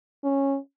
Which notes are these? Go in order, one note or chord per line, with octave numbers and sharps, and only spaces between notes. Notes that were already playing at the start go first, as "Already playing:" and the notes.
C#4